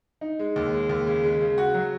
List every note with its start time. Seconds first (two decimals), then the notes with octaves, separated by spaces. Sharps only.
0.21 D#4
0.39 G#3
0.56 D#2
0.73 G#3
0.89 D#2
1.07 C#3
1.24 G#3
1.41 C#3
1.58 F#4
1.74 F#3